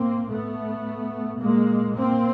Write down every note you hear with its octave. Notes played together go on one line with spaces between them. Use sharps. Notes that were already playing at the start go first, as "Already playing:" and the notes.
Already playing: A2 A#3 C4
A2 A3 B3
A#2 G#3 A#3
A#3 C4